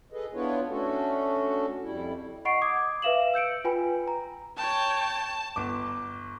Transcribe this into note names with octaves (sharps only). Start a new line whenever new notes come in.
G#4 A4 B4 D#5
B3 D4 E4 F4 B4 C#5
A3 C#4 D4 F#4 A4
F2 G3 E4
D#5 F#5 B5 C#6 C7 D7
D6 D#6 G#6
B4 E5 F5 E7 F#7
E6 G6 C#7 D7
F4 B4 G5 G#5 B5
A#5
C#5 G5 A5
G1 D6